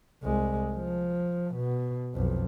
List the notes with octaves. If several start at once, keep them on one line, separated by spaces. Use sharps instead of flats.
C2 G#3
F3
B2
B1 F2